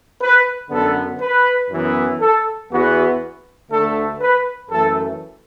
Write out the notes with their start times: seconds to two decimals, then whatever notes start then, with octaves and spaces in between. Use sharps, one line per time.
0.20 B4
0.70 F#2 D3 B3 A4
1.20 B4
1.70 F#2 E3 B3
2.20 A4
2.70 E2 E3 B3 F#4
3.70 D2 D3 A3 A4
4.20 B4
4.70 F#2 E3 A3 A4